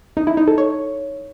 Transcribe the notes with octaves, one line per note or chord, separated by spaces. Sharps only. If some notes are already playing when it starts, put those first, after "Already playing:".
D#4
E4
D#4
A4
C#5